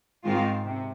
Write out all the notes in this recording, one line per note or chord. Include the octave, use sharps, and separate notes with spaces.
G#2 D#3 G#3 C4 F4
C3